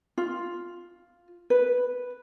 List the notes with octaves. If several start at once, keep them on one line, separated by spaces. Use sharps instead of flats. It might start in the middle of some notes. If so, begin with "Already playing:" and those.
F4
B4